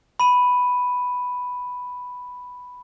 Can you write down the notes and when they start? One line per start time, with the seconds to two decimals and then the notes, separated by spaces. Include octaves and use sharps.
0.20 B5 D#7